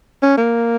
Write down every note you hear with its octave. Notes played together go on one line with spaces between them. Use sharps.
C#4
A#3